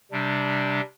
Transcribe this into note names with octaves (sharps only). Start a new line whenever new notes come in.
C3 G3 D4